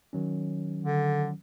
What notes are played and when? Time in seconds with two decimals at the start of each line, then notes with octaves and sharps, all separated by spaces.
0.13 D#3 F#3 C#4
0.84 D3